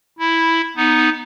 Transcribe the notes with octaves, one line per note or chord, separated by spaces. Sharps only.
E4
B3 D#4